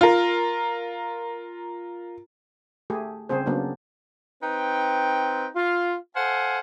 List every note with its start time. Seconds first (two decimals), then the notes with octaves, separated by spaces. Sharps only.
0.01 F4 A#4
2.90 A3 G4 G#4
3.29 C#3 G3 C4 G#4 C5
3.46 C#3 F#3 A#3 B3 C#4 D4
4.43 C4 D#4 B4 G5
5.56 F4
6.16 A4 C5 F5 F#5 G#5